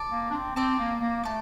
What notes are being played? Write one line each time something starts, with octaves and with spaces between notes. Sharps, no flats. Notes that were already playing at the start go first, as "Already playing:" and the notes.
Already playing: D5 A5 D6
A#3
D4
C4
C4 D5 A5 D6
A#3
A#3
A3 D5 A5 D6